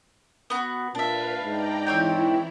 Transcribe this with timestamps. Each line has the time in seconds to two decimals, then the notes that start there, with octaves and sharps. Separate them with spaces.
0.50 B3 F#4
0.95 A#2 D4 B4 E5 F5
1.43 G#2 D5 G5 A#5
1.86 E3 C4 E4 C#5 G5